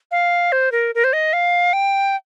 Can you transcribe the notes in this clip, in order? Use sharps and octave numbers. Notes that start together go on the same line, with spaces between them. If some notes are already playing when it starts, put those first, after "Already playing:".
F5
C5
A#4
A#4
C5
D#5
F5
G5